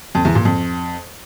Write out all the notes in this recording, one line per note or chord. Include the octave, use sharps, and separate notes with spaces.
F2
E2
A#2
F2